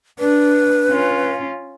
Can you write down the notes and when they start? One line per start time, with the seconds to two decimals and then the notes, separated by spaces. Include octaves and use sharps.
0.19 D4 B4
0.90 C#4 F4